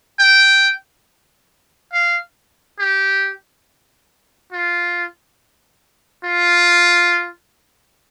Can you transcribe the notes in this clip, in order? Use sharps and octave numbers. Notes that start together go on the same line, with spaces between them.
G5
F5
G4
F4
F4